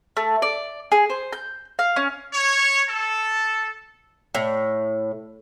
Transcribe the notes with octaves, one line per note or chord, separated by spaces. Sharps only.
A3
D5
G#4
C5
G6
F5
C#4
C#5
A4
A2